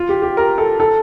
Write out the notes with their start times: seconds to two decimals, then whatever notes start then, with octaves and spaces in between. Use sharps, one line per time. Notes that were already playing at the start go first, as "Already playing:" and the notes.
Already playing: F4
0.09 G4
0.22 G4
0.37 A#4
0.58 A4
0.80 A4